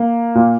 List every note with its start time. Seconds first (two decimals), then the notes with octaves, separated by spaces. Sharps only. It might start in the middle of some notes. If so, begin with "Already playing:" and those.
Already playing: A#3
0.35 A#2